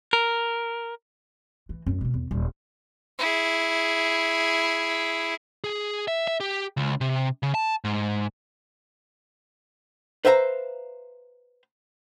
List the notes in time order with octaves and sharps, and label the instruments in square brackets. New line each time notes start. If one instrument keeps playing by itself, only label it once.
[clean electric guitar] A#4
[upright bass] E3
F#2
B2 C#4
E2
D#1
[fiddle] E4 G#4
[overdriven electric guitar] G#4
E5
E5
G4
C#2
C3
C#3
A5
G#2
[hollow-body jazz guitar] B4 C5 E5 F5 A5 A#5